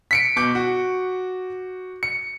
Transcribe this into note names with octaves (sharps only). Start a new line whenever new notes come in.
B6 C#7 D7
B2 D6 G6
F#4
C#7